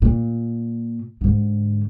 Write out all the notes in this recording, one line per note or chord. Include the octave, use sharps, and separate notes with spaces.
A#2
G#2 D3